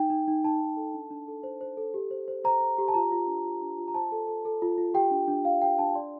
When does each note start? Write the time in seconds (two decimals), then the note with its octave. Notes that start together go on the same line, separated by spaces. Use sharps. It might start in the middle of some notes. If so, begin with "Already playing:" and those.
Already playing: D#4 G5
0.10 D#4
0.28 D#4
0.44 D#4 A5
0.61 D#4
0.77 A4
0.94 D4
1.11 D4
1.28 A4
1.43 C5
1.61 C5
1.77 A4
1.94 G4
2.11 C5
2.28 C5
2.44 C5 A#5
2.61 C5
2.78 G4
2.88 A5
2.94 F4 A#5
3.12 F4
3.27 D4
3.45 F4
3.62 D4
3.78 F4
3.88 A#5
3.94 C5 A5
4.12 A4
4.28 A4
4.45 A4
4.62 F4
4.78 F4
4.94 G4 G5
5.11 D4
5.28 D4
5.45 D4 F5
5.62 G4 G5
5.79 D4 A5
5.95 D5 C6